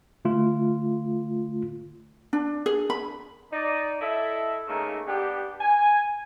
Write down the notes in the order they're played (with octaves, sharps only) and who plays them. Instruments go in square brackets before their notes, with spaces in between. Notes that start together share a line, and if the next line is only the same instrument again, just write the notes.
[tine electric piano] D3 A3 F4
[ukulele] D4
G#4
B5
[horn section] D#4 D5
E4 A4 D#5 E5
C#3 A3 A#3 D#4
B3 D4 G4
G#5